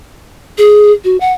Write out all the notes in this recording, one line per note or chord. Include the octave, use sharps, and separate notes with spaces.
G#4
F#4
F#5